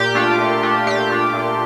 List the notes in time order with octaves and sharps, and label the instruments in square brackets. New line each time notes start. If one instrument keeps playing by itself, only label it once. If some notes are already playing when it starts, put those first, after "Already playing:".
Already playing: [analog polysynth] A#2 G4
A3 D4 F4
A#2
A3 D4 F4
A#2 G4
A3 D4 F4
A#2